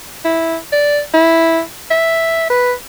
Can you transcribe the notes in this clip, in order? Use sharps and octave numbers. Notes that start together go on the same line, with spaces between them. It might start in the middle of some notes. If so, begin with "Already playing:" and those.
E4
D5
E4
E5
B4